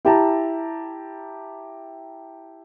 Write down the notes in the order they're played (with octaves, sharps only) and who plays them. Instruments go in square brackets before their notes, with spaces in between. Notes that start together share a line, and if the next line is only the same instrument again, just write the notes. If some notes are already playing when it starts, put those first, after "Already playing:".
[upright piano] E4 G4 A5 A#5